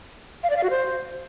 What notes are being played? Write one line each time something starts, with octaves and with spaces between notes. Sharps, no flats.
F5
D5
F5
F#4
C5